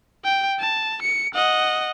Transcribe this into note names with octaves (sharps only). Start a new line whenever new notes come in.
G5
A5
C#7
D#5 F#5